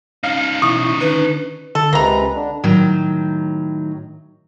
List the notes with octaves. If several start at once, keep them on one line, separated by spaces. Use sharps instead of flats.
C#4 D#4 F5
B2 E3 E4 C#6 D#6
D3 D#3 B4
D3 A4
C#2 C3 G#3 A#3 B4 A#5
D3 D4
A2 D#3 F#3